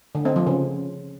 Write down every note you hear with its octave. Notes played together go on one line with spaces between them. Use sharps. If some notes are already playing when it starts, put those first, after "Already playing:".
D3
C4
F3
C#3